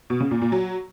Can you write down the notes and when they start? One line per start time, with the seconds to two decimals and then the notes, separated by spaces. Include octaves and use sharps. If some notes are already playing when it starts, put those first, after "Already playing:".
0.10 B2
0.20 C#3
0.31 A#2
0.42 A#2
0.52 F#3